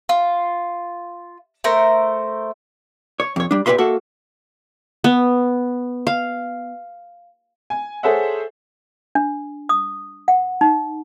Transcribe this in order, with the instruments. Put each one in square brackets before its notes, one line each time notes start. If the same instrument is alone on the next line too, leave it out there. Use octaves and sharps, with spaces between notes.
[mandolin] F4
A3 A#4 C5
[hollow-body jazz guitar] C#5
F2 C#5
G3 D4
A#2 G4 B4 E5 C6
A#3 F#4 A4 E5
[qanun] B3
F5
[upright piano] G#5
G#4 A4 C5 C#5 E5 F#5
[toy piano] D4
D#6
F#5
D#4